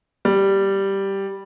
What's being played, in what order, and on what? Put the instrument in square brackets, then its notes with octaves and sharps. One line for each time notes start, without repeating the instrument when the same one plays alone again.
[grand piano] G3